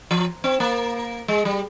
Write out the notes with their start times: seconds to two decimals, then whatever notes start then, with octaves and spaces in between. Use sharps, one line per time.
0.11 F3
0.44 C4
0.60 A#3
1.28 G#3
1.45 G3